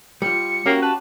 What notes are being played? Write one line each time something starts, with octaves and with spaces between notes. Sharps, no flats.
G3 F4 C#7
A#3 C#4 F#4 G4
B4 A5